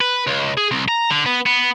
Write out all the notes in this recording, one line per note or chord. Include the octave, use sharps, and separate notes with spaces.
B4
C#2
G#4
C2
A#5
D3
B3
B3